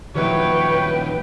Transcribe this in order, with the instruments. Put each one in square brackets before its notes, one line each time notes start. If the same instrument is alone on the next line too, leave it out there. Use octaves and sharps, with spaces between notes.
[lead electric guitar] A#2 D#3 [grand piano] F3 F#3 E4 [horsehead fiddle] B4 G5 [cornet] C#5